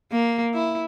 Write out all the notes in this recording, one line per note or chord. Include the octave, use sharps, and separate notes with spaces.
A#3
E4